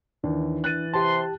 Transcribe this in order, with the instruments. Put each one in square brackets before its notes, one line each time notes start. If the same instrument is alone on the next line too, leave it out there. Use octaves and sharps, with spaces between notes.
[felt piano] D#2 [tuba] E3 [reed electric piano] D4
[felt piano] F#6 A6 D#7
[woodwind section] C3 C6 [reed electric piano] G4 A5